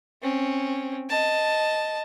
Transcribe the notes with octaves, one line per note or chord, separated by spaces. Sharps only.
C4 C#4
D#5 A5